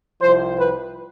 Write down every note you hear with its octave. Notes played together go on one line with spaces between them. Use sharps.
C2 C3 F3 C5
B4